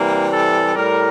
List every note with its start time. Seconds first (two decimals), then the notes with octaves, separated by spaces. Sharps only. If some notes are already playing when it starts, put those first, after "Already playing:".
Already playing: C3 E3 G3 A#3
0.30 A4
0.75 A2 G3 A#4